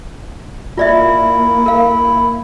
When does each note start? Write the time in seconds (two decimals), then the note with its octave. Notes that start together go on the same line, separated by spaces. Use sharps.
0.77 A#3 E4 F4 D5 E5
1.66 A#4 F5